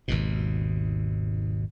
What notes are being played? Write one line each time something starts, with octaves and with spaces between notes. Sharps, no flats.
G#1 D#2 B2